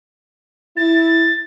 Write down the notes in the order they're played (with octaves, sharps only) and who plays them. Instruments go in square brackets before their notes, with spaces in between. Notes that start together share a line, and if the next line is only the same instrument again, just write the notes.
[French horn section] E4 [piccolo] A6